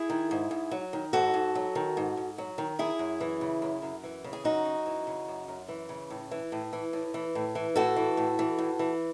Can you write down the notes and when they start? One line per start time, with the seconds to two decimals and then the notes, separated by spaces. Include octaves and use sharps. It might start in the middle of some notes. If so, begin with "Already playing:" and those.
Already playing: E4 G#4
0.10 D#3
0.31 G#2
0.51 G#2
0.71 F#3
0.93 D#3
1.13 G#2 F#4 A4
1.34 G#2
1.55 F#3
1.75 D#3
1.97 G#2
2.17 G#2
2.38 F#3
2.58 D#3
2.79 F#2 E4 G#4
2.99 F#2
3.20 E3
3.41 C#3
3.62 F#2
3.82 F#2
4.03 E3
4.24 C#3
4.33 G#4
4.44 F#2 D#4 F#4
4.65 F#2
4.86 E3
5.07 C#3
5.28 F#2
5.48 F#2
5.68 E3
5.89 C#3
6.10 A2
6.31 E3
6.52 A2
6.73 E3
6.93 A2
7.14 E3
7.35 A2
7.55 E3
7.76 A2 F#4 A4
7.96 E3
8.17 A2
8.39 E3
8.59 A2
8.79 E3